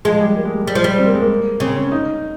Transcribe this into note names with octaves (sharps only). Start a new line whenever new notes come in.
F3 G#3
G3
A#3
G#3
G3
G#3
G3
F3
G3
C4
A#3
G#3
A#3
C#3 C4
C#4
D#4